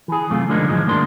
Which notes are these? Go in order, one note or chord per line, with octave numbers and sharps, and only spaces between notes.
E3 G#4
F#2 C3 A3 F4
D3 F3 G#3 A#3 D4 D#4
F#2 A2 D#3 F3 G#3
D2 G2 G#3 A#3 D4 C6